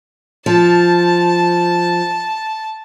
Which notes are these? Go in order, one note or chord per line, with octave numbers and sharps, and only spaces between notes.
F3 A5